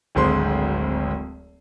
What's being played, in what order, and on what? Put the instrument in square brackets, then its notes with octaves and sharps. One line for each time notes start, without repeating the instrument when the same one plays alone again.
[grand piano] D1 G#1 D2 G#3 C5 C6